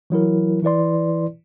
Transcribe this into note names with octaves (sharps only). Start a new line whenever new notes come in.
E3 F#3 E4 A#4
E3 E4 B4 D5 C6